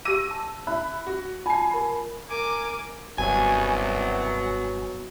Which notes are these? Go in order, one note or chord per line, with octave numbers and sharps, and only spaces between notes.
G4 D6 E6 A#6 D#7
A5
E4 B5 F#6
F#4
F4 G#5 A5 B5 C7
A#4 B5
A#4 G#5 D6
F#1 C2 G2 B2 F#3 G#5